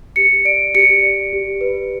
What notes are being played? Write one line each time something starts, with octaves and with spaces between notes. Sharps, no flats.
G4 C#7
D5 D7
G4 C#7
D5
G4
B4